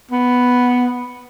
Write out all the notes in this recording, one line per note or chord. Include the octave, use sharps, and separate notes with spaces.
B3